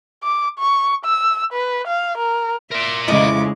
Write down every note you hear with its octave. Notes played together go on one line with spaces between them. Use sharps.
D6
C#6
E6
B4
F5
A#4
A#4 D5 E5 C6
F2 C#3 G#3 E4 D#5 D6